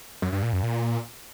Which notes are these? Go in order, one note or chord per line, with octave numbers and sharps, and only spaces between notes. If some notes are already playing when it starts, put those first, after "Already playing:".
F#2
G2
A#2
F#2
A#2